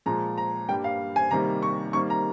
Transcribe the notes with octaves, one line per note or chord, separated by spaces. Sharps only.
A#2 F3 G#3 A#5
A#5
G2 G3 A#3 G5
F5
G#5
C3 D#3 G3 A#3 A#5
C#6
C3 D#3 G3 A#3 C#6
A#5